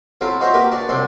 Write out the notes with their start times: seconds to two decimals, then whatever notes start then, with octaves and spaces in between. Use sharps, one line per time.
0.21 F#3 C4 E4 F4 A4
0.40 D#4 F#4 C5 E5 A#5
0.54 A#3 F#4 G4 A#4 B4
0.72 D4 F#4 A5
0.89 C2 F#3 C4 D4 C6